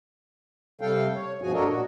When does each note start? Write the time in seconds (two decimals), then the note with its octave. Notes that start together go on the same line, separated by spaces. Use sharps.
0.81 C3 G3 A4 F5 G5
1.15 C#5
1.42 G2 B2 F3 F#4 G#4 G#5
1.53 D4 F#4 A4 A#4 C#5 D#5
1.69 A#2 F#4